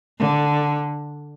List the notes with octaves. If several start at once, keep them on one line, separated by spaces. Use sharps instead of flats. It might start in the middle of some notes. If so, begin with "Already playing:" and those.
D3